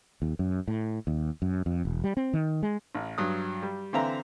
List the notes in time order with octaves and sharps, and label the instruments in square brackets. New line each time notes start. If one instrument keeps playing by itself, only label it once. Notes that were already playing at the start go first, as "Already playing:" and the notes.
[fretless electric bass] D#2
F#2
A2
D#2
F#2
F2
E1
G3
C4
D#3
G#3
[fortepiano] A1
G2 F#3 D#6
G3
D3 E3 C4 E5 F5 A#5